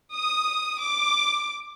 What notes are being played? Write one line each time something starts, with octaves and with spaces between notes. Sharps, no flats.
D#6
D6